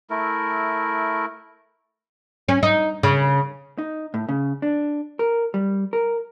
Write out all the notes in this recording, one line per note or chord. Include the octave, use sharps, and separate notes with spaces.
A3 E4 A#4
C#4
D#4
C#3
D#4
A2
C#3
D4
A#4
G3
A#4